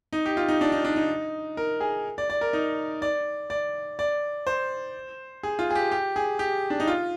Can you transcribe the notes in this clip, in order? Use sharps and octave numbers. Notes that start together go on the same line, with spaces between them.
D#4
G4
F4
D#4
D4
D#4
D4
D#4
A#4
G#4
D5
D5
A#4
D#4
D5
D5
D5
C5
G#4
F4
G#4
G4
G4
G#4
G4
D4
D#4
F4